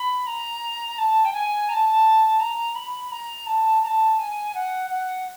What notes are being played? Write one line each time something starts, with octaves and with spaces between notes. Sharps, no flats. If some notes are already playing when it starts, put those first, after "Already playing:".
Already playing: B5
A#5
A5
G5
G#5
A#5
A5
A#5
B5
A#5
A5
A#5
A5
G#5
F#5
F#5